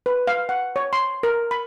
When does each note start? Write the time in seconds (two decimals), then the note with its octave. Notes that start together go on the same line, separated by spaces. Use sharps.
0.06 B4
0.27 F5
0.49 F#5
0.76 C#5
0.93 C6
1.23 A#4
1.51 B5